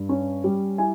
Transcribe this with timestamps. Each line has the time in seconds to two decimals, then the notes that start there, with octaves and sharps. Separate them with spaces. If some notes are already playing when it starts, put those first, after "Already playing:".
Already playing: G2
0.09 C#4
0.44 G3
0.78 E4 G#5